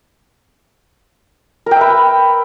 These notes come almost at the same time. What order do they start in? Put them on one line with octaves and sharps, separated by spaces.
A#4 G5 E5 B4